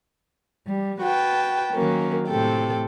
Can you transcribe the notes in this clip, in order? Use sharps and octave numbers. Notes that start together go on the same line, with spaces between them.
G3
F#4 B4 G5 A5
D#3 F#3 A#3 C#4
A2 C3 A4 G5